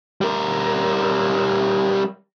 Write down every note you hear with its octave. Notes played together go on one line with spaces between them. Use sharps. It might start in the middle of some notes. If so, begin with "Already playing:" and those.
G3 A#4